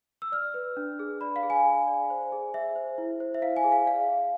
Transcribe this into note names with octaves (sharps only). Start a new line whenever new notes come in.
E6
D5 F6
B4
D4
G#4
D5 B5
F5
G#4
G#5
G#4
D5
C5
G#4
G#4 E5
C5
E4
C5
E5
E4 F5
G#5
G#4
F5
D5 F5
G#4